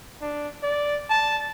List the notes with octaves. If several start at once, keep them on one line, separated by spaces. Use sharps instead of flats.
D4
D5
A5